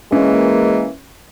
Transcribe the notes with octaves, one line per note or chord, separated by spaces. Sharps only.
E3 G#3 A#3 C#4